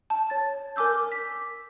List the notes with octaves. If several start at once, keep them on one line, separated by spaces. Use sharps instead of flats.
A5
C#5 A6
A#4 G#5 D6 E6 G6
B6